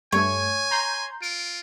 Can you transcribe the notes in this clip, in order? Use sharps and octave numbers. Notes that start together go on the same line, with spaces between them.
G2 A3 C#5 G#5
A#5 C6 G6
F4 D7